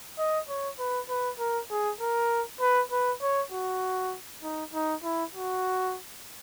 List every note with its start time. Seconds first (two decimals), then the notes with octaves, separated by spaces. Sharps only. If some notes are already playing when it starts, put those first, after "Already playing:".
0.18 D#5
0.49 C#5
0.79 B4
1.09 B4
1.39 A#4
1.71 G#4
2.01 A#4
2.61 B4
2.91 B4
3.21 C#5
3.52 F#4
4.43 D#4
4.74 D#4
5.03 E4
5.34 F#4